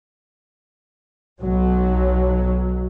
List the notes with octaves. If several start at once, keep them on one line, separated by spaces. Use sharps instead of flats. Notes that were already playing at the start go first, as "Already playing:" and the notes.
B1 F#3